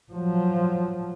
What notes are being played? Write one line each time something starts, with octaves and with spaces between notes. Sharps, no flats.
F3 F#3